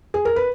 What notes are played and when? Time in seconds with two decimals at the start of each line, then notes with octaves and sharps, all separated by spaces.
0.14 G#4
0.25 A#4
0.36 B4